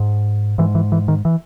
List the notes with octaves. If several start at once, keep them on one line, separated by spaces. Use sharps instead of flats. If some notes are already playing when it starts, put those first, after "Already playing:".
Already playing: G#2
G#2 E3
E3
E3
D#3
E3